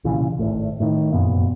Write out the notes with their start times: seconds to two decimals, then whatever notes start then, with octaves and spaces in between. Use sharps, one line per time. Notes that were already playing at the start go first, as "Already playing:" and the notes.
0.04 C2 A#2 C#3 E3
0.39 G#1 A2
0.80 A2 D#3
1.12 F1 F#2 A#2 B3